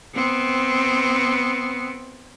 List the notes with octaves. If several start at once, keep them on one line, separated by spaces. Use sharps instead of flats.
B3 C4